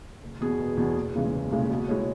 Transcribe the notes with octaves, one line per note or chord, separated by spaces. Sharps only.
F#1
E2 B2 B3 G#4
F#1
E2 B2 B3 G#4
F#1
E2 C#3 E3 G#3
F#1
E2 C#3 E3 G#3
B2
G#3 E4 C#5